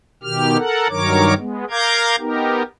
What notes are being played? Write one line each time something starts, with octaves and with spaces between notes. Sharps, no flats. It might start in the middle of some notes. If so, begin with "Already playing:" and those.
B2 D#3 G4 F6
A4 A#4 F#5
G2 D#3 F#3 A#4 C#5 D6
G#3 B3
A#4 F5 A#5 D6 G6 G#6
B3 D#4 G4 A#4